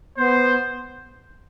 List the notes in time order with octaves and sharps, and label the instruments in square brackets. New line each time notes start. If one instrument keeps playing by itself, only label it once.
[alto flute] B3 [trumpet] C5